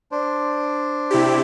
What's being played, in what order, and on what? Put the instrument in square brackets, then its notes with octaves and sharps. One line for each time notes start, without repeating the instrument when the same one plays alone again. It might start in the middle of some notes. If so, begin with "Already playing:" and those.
[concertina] D4 C5
[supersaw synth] C3 E4 G4